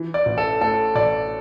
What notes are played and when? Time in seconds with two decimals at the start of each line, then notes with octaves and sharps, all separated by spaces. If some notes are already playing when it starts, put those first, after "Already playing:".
Already playing: E3
0.14 D5
0.26 A1
0.38 A4
0.61 A2 A4
0.96 A1 D5